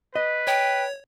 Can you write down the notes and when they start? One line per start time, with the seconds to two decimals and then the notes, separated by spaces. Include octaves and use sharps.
0.15 B4 D#5
0.47 C#5 G5